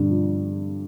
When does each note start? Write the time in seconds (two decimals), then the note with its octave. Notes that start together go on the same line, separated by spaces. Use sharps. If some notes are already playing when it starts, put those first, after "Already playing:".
Already playing: G2 D3
0.10 F3